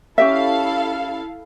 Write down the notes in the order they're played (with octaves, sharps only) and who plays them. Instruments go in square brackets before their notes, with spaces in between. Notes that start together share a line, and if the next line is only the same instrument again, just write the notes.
[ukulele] C#4 G4 E5 [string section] E4 A4 F5